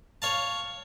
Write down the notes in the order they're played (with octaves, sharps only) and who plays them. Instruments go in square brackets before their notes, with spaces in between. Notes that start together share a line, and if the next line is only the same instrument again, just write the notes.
[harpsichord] C#5 F5 A5